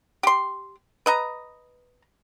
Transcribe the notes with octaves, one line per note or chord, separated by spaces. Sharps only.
G4 C6
B4 D#5 A#5